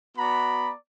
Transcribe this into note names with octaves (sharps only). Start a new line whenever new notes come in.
B3 F#4 D5 A#5 B5